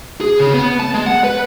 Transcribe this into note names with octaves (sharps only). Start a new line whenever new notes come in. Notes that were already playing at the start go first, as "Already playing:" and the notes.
G#4
C#3
B3
A5
G#3
F#5
B4